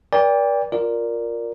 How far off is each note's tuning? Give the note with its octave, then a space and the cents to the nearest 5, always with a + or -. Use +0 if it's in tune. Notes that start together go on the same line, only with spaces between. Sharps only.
A#4 +45 D5 -20 G5 +30
F4 +10 A#4 +0 D5 +0